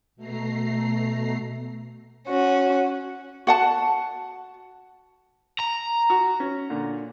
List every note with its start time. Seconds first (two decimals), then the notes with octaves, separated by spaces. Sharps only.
0.16 B2 A3 A#5 C7
2.27 C#4 F#4
3.47 F#4 F#5 A5
5.59 A#5
6.10 F#4
6.40 C#4
6.70 A#2 D3